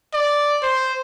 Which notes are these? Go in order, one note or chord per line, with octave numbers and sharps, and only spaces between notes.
D5
C5